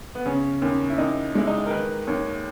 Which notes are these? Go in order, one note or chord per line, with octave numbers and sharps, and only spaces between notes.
B3
C#3 C#4
D#2 C#4
E4
D#2 D#4
G#3 E4
D#4
A#4
D#3 B4
D#2 C#5